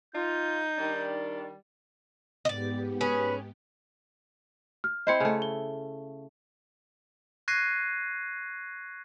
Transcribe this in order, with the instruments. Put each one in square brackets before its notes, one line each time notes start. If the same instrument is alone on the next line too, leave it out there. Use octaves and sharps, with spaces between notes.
[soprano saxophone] D#4 [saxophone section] F4 [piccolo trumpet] G6
[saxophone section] D#3 G3 D4
[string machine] G#2 B3 G4 [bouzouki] D5 D#5
[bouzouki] C#4 G#4 [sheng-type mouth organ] B4
[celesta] F6
[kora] C4 E4 C5 [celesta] D#5 C#7
[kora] C#3 A3
[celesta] G7
[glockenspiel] C#6 F#6 G#6 A#6 C7 D#7